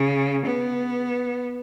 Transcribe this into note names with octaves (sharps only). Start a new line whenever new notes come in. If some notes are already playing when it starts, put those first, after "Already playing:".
Already playing: C#3
B3